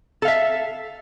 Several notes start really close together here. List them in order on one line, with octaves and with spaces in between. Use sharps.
A4 F5 E5